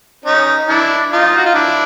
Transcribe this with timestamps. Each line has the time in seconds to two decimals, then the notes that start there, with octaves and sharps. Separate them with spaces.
0.24 C#4 D#4
0.68 D4 E4
1.12 D#4 F4
1.37 F#4
1.45 F4
1.55 D4 E4